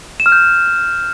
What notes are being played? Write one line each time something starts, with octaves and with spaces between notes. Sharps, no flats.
E7
F6
G6